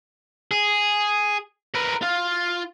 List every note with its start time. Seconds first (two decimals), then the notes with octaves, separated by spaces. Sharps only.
0.51 G#4
1.74 A#4 B4
2.02 F4